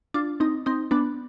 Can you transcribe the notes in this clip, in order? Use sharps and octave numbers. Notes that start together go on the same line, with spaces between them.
D4 F4
C4 D#4
C4 D#4
B3 D4